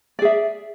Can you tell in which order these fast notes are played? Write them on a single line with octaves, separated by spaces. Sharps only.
D5 G#4 E5